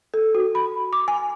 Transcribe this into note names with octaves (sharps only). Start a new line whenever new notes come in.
A4
F#4
B5
D6
G#5